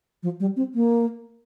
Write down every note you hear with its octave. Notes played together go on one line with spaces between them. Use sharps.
F3
G3
C4
A#3